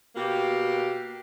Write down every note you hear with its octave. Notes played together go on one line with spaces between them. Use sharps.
B2 A#3 G4